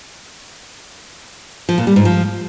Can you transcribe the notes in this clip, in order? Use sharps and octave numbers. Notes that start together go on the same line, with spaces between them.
F3
A#2
G3
G#2
F3